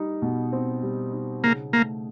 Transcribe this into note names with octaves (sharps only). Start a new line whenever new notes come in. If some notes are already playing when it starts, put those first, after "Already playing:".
Already playing: G3 D#4
B2
C4
G3
D#4
C#3 A#3
A3 A#3